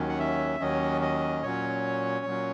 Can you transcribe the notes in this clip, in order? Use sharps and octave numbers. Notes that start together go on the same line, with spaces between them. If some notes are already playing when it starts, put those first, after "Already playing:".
Already playing: D#2 D#3 F#3 C#4
F#5
E5
D#2 D#3 F#3 C#4 D#5
D#5
A#2 F#3 C#4 C#5
A#2 F#3 C#4